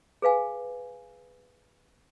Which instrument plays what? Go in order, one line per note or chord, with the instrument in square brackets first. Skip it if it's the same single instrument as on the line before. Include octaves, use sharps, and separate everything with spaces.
[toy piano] G#4 B4 F5 G#5